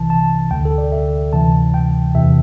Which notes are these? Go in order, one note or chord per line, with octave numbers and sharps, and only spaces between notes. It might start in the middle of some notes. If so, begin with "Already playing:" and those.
Already playing: C2 C3 E3 A5
A5
D2 D3 G5
A4
D5
E5
D2 C3 E3 A5
G5
E2 C3 E3 E5